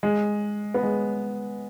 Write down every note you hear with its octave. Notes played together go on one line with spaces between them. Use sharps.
G#3
B3
G#3